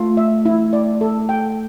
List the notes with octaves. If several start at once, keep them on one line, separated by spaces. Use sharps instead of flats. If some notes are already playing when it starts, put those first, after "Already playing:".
Already playing: A3 F4
E5
E4
D5
A4
G5